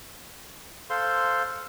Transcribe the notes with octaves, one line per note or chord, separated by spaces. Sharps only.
A4 C5 F5 C6